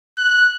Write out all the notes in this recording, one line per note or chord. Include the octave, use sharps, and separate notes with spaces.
F#6